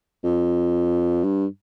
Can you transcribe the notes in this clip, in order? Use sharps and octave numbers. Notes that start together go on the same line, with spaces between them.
F2
G2